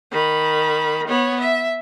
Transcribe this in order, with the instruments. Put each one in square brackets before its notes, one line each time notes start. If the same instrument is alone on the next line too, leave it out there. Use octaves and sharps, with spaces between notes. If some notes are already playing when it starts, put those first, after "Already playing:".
[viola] D#3 B5
B3 C#5
E5